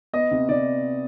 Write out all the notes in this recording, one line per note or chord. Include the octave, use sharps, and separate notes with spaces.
B3 D#5
C3
C3 D5